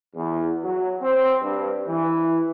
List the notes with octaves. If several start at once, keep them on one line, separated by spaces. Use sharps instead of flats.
E2
F#3
C4
G2
E3